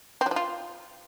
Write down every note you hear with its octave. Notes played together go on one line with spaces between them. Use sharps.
C4
F#3
F3
F4